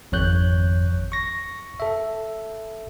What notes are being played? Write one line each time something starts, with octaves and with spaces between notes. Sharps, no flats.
G#1 F2 C#5 F#6 G6
C#6 A#6
A4 E5